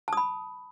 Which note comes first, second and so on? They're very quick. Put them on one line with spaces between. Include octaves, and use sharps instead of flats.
A5 D#6 B5